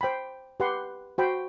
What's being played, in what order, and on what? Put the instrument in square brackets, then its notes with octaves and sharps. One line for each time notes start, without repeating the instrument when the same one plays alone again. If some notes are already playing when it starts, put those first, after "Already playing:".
[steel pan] C5 G5 B5
G4 B4 F#5 C6
F#4 C5 G5 B5